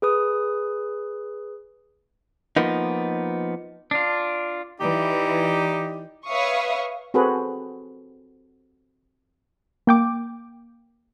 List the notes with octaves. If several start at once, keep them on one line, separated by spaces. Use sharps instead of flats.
G#4 B4 D#6
F3 A#3 B3 D#4
D4 F4
E3 D#4 G4 D5
B4 C#5 E5 F5 C#6 D#6
C4 F#4 G#4 A4 B4
A#3 G5 D6